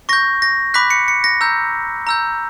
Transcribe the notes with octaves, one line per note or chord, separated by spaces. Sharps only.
C#6 G6 A#6
A#6
B5 D6 F#6 B6
C#7
C#7
A#6
A#5 E6 G6
A#5 E6 G6